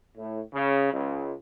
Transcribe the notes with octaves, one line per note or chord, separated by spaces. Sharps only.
A2
C#3
C#2